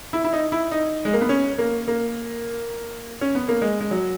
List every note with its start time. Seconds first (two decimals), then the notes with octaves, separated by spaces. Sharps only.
0.13 E4
0.24 E4
0.33 D#4
0.52 E4
0.71 D#4
1.05 G#3
1.13 A#3
1.21 B3
1.29 C#4
1.58 A#3
1.88 A#3
3.21 C#4
3.35 B3
3.48 A#3
3.61 G#3
3.80 G#3
3.91 F#3